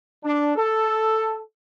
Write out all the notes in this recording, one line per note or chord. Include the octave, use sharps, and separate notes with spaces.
D4
A4